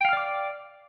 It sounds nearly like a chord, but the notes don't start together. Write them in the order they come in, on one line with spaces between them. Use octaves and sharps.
G5 F5 F6 D5 D6